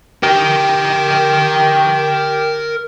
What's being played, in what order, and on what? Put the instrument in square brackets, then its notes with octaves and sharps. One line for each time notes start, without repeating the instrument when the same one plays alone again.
[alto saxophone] G4 [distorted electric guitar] A#4 G5